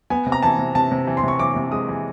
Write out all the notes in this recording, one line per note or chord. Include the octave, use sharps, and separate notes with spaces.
B3 G#5
C3
A#5
E3 A5
C3
C3 A5
C3
E3
C6
C3 C#6
E3 D6
C3
G#3 D#6
E3